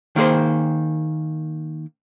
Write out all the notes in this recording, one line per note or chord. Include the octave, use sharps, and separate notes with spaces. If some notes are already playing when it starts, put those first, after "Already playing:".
D#3 A#3 G#4 C5